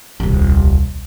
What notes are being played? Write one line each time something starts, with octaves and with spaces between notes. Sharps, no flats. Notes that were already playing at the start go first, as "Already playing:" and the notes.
D#1 C2